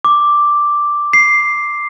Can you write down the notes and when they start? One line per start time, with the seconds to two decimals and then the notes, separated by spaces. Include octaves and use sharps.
0.05 D6
1.13 C7